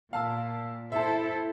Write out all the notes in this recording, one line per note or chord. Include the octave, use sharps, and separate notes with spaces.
A#2 F5 A5 E6
E4 A4 C5 E5 A5